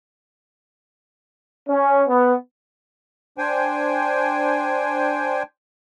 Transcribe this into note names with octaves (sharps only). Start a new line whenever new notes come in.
C#4
B3
D4 C5 G5 G#5